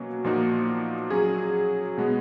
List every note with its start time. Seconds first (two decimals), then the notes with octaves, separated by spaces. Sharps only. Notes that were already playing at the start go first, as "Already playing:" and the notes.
Already playing: B2 F#3 A#3 C#4 F#4
0.24 A#2 F3 A#3 D#4 F#4
1.10 F#3 C#4 G#4
1.97 B2 G#3 B3